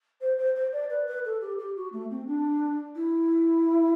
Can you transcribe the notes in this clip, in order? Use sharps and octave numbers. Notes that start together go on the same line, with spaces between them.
C5
C5
C5
D5
B4
B4
A4
G4
G4
F#4
A3
C4
D4
E4